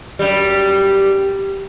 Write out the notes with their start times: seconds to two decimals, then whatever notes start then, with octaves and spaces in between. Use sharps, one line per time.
0.19 F#2 G3